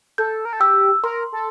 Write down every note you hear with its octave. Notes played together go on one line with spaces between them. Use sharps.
A4 G6
A#4
A4
G4 E6
A#4 C6
A4